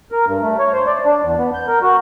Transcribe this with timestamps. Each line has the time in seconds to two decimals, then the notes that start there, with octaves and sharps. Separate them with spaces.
0.12 A#4
0.26 G2
0.42 A3
0.59 C#5
0.73 C5
0.87 D5
1.05 D4
1.23 E2
1.38 B3
1.54 G6
1.67 A#4
1.82 F#4